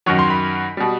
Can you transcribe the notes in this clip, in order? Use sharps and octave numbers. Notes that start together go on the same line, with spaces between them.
F#2 D#3 F#3 C#6
C6
B5
B2 G3